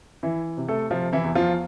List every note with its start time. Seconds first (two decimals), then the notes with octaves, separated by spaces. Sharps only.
0.23 E3 E4
0.57 C3
0.68 A3 A4
0.91 C3 F3 F4
1.13 E3 E4
1.24 E2
1.35 F3 F4